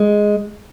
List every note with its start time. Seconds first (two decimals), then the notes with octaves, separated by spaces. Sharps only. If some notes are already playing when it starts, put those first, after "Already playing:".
Already playing: G#3